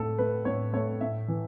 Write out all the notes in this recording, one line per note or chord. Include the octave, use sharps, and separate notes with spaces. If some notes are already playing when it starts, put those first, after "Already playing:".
Already playing: A2 A3 A4
A3 B4
A2 C#5
A3 C#5
A2 E5
E3